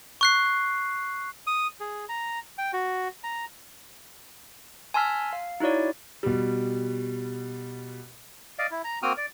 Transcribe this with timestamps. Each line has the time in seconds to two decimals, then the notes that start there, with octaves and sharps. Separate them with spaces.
0.21 C#6 F#6 C7
1.47 D#6
1.80 G#4
2.09 A#5
2.58 G5
2.73 F#4
3.24 A#5
4.94 G#5 A5 C6 E6 F6 B6
5.33 F5
5.60 D#4 E4 F#4 C#5 D5
6.23 B2 G3
8.59 D5 D#5 F5
8.71 E4
8.84 A#5
9.03 A#3 C4 F#4 G5 D#6 F6
9.17 D5